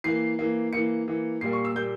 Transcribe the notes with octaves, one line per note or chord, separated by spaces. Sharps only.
E3 A#3 C7
E3 A#3
E3 A#3 C#7
E3 A#3
A#2 G3 A#3 C7
C#6
E6
A#2 G3 A#3 G6